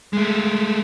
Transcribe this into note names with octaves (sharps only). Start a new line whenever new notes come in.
G#3 A3